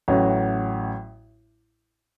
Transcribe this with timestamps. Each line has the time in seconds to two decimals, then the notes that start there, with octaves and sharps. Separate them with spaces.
0.08 A1 A2 F#3 C#4 F#4